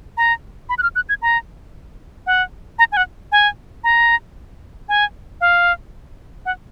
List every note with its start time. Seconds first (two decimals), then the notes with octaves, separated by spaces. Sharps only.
0.17 A#5
0.69 B5
0.78 F#6
0.83 F6
0.96 F#6
1.09 G#6
1.22 A#5
2.27 F#5
2.79 A#5
2.92 G#5
2.97 F#5
3.32 G#5
3.84 A#5
4.89 G#5
5.41 F5
6.46 F#5